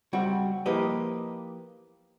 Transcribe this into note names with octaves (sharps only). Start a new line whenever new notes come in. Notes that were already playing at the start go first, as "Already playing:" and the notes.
C#2 G3 C4 F#4
F3 A#3 E4 G4 B4 D#5